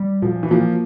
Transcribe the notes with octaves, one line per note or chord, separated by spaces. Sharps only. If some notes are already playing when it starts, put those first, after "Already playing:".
Already playing: G3
A#2 F3
E3
F3 A#3